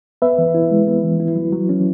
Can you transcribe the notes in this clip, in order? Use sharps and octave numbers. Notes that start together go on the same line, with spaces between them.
B3 B4 E5
E3
E4
G#3
B3
E3
E4
F#3
F#3
C#4